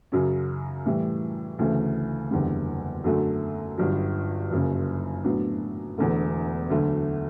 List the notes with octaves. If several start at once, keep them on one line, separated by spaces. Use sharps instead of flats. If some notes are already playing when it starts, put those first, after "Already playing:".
F#2 C#3 F#3 C#4
A2 E3 G3
D2 C#3 E3 A3
F#1 E2 D3 G3
F#2 D3 F#3 A3
G1 G2 F#3
F#1 F#2 C#3
A2 F#3 B3 D4
E1 E2 D3 A3
D2 D3 F#3 A3